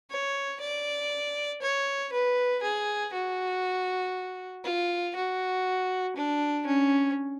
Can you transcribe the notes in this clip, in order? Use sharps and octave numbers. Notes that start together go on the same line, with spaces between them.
C#5
D5
C#5
B4
G#4
F#4
F4
F#4
D4
C#4